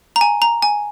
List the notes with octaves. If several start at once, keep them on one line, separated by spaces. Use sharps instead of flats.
A#5
G#5
A#5
G#5